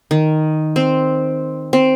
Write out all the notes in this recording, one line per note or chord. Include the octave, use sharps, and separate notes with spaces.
D#3
C4
C4